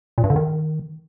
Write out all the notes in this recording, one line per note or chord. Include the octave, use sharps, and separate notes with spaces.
A#2
G2
D3
D#3